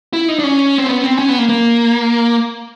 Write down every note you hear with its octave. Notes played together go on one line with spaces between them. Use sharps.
E4
D#4
D4
C#4
C4
B3
C4
C#4
B3
A#3
A#3